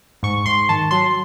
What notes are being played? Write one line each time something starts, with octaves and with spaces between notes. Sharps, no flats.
G#2 C#6
G#2 C6
D#3 A5
F#3 C6